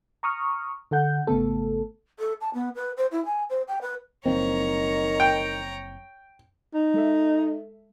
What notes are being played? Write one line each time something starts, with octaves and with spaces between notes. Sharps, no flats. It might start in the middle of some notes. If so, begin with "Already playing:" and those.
A#5 C#6 D#6 F6
D3 A4 F#5 G6
G#1 C#3 A3 B3 A4
A4
A5
B3
B4
C5
E4
G#5
C5
G5
B4
F#1 D#3 F3 C4 C#5 A#5
G5
D#4
G#3 A4 E5